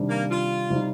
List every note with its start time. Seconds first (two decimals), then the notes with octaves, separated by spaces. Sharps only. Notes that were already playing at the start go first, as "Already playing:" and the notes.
Already playing: C3 D#3 G3 D4
0.09 A#3
0.30 F4
0.70 C3 G3 C4 D#4